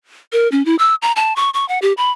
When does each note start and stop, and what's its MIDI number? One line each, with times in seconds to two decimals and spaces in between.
0.33 0.50 70
0.52 0.65 61
0.65 0.76 64
0.79 0.95 88
1.02 1.12 82
1.16 1.33 81
1.36 1.50 85
1.54 1.67 85
1.69 1.79 78
1.82 1.93 67
1.97 2.11 83